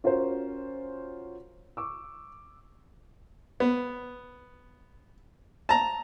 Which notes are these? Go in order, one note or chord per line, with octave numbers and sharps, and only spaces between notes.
C#4 F4 F#4 A#4 C5
C#6 D6 E6
B3
A5 A#5